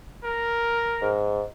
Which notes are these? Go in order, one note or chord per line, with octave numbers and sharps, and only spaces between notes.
A#4
G#2